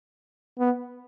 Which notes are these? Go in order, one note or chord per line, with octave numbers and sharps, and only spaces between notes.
B3